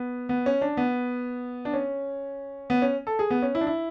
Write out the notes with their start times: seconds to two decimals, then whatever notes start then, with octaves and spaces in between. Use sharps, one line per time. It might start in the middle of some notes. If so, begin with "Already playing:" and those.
Already playing: B3
0.29 B3
0.46 C#4
0.61 D4
0.77 B3
1.65 D4
1.74 C#4
2.70 B3
2.82 C#4
3.07 A4
3.19 G#4
3.30 B3
3.42 C#4
3.55 E4
3.61 D4
3.67 E4